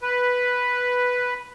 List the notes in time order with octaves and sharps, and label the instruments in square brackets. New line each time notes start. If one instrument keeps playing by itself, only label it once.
[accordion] B4